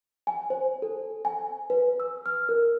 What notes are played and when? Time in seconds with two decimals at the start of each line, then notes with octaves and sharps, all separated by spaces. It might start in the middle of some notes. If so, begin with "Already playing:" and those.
0.27 G#5
0.50 C5
0.82 A4
1.25 G#5
1.70 B4
2.00 E6
2.26 F6
2.49 A#4